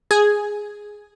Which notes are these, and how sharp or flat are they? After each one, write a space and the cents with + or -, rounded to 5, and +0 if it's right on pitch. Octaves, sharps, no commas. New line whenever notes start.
G#4 +0 G#5 +0